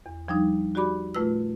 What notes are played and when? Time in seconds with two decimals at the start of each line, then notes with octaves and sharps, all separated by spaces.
0.06 E2
0.28 F3 G3 D4 D#4
0.75 F#4 G4 D5 B5 D6
1.15 A#2 A3 F4 B4 E6